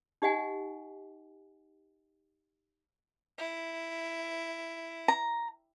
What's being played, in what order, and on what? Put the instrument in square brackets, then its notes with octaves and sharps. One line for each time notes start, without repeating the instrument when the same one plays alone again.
[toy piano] D#4 G4 D#5 F#5 G#5
[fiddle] E4
[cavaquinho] A#5